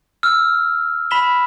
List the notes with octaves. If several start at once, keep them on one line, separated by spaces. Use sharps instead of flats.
E6 F6
B5 B6 E7 G7